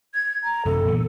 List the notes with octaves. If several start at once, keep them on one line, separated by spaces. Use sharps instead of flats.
G#6
A#5
F#2 C3 A4
A#2 E3 B3